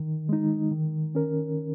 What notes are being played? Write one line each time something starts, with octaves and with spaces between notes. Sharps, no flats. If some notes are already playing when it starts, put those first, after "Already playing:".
Already playing: D#3
G#3 D#4
D#3
C#4 A#4